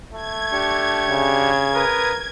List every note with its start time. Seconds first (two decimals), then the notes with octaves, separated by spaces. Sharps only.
0.13 A3 G#6
0.52 D4 G4 C#6
1.09 C#3
1.74 A#4 B4 D#6